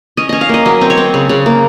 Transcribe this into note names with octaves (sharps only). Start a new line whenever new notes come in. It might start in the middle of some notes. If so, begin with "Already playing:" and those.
C#4 D#5
C#4 D#5
F5
A#3 D#5
F#3 D#5
C4
C#5
C4
C#3
C#3
A#3